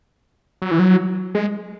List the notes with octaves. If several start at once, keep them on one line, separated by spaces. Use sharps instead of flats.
F#3
E3
F#3
G#3